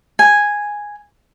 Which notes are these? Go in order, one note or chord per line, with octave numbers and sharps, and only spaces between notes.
G#5